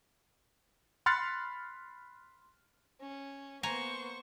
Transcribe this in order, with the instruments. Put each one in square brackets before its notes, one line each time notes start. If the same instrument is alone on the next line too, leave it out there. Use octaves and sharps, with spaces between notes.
[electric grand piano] B5 C6 F6 F#6 A6 C#7
[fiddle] C#4
[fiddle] A#3 B3 [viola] C5 C#6 [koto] G#5 A#5